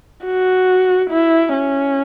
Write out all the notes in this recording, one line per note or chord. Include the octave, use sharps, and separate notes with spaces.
F#4
E4
C#4